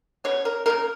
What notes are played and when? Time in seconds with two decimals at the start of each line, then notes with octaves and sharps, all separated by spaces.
0.24 G#3 B3 C#5
0.28 C#3
0.45 A#4
0.66 C#3 F3 A#3 A#4